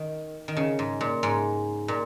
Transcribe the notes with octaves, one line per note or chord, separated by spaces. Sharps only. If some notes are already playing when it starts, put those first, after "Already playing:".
Already playing: D#3
D#3
C#3
G#2
A#2
G#2
A#2